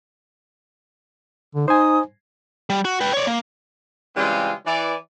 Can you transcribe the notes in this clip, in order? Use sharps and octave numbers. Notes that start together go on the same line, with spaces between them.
D3
D#4 C5 G#5 D#6
G3
F#4
B4 G5
C#5 D5
A#3
C#3 E3 G3 G#3 C4 F4
E3 D5